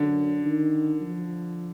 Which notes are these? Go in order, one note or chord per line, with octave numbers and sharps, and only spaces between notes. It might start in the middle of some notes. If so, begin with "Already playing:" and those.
Already playing: F#2 D3
D#3
F3